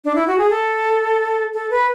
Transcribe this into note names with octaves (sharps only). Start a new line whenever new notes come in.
D4
E4
F#4
G#4
A4
A4
B4